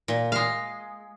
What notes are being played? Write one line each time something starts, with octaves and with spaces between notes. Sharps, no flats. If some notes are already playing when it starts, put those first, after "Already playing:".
A#2
G#3 F5